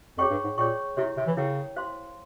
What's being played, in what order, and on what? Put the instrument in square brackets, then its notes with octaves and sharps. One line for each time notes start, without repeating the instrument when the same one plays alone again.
[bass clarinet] F2 [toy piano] G#4 C#5 G5 C#6
[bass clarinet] G2
G#2
[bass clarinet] A#2 [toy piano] G#4 C#5 G5 C#6
[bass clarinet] C3 [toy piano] E4 G4 C#5
[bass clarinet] C3
E3
[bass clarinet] C#3 [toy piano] E4 A#4 C#5 G5
[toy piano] C5 F5 C6